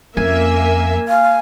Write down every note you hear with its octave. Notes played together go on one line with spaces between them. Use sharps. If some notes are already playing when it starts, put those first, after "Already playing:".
F2 A#3 C#4 E5 G#5
F5